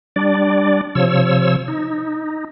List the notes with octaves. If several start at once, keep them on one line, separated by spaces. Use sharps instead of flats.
G3 D4 D5
C3 F3 C#5 E6
D#4